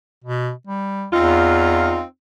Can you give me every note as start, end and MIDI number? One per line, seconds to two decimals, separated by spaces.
0.24 0.52 47
0.67 1.08 55
1.13 2.00 40
1.13 2.01 60
1.13 2.01 63
1.13 2.01 65